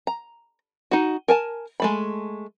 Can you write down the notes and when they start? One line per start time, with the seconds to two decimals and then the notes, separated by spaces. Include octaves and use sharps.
0.07 A#5
0.91 D#4 F#4
1.28 A#4 G#5 A5
1.80 G#3 A3 B5